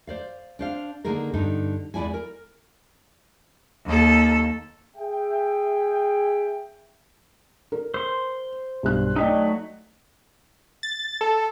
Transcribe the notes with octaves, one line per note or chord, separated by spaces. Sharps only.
C5 D5 F5
D4 C5 F5
D3 D#3 A#3 D#4 G#4 A#4
G2 D3 B3 D#4
E2 G#3 E4 D5 G#5
A#4
D#2 A4
G#4 E5 G5
A#4
C5 C6
B1 G2 F#6
F#3 A3 D#4 D5 D#5 G5
A6
A4